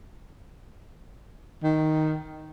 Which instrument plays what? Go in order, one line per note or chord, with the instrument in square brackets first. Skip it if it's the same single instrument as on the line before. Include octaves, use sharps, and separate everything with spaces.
[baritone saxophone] D#3